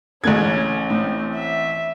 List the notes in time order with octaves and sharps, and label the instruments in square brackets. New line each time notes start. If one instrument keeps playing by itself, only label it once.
[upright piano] A1 G#6 [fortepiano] G#3 A3 F#6 [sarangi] C#4
[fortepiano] A2 [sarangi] C4
[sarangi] E5